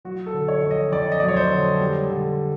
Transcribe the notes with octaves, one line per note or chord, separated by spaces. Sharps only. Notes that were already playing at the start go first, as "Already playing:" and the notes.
F#3 F#4
A4
D3
C#5
F2
D#5
F2 D5
D#5
F#3 D5
C#5
C5
D3
G3
D3